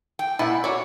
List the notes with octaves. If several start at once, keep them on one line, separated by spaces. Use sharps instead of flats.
G5
A#2 E4 F#5
F#4 C#5 D5